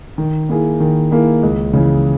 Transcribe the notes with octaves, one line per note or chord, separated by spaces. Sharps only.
D#3
A#3 E4 G#4
D#3
A#3 E4 G#4
C#2
C#3 E3